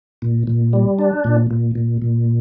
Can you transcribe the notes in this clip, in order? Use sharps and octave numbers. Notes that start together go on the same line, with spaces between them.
A#2
A#2
G3
D4
A#2
A#2
A#2
A#2